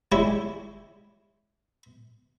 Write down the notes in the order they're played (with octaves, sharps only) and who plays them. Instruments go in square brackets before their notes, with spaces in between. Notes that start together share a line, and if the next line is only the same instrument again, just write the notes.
[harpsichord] G3 G#3 E4 G4 C#5